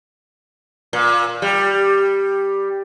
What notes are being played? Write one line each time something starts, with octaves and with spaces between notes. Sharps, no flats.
A#2
G3